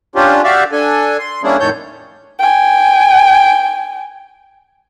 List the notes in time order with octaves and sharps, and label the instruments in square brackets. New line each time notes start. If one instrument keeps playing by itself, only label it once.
[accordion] C#4 D4 F4 G4
F#4 G4 D5 E5 F5
D4 A4 G#5
C6
G3 A#3 C#4 D4 E4 G#4
F2 A2 D#3 A4 C#5 G6
[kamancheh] G5 G#5